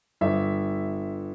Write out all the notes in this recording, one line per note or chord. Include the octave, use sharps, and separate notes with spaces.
G1 E5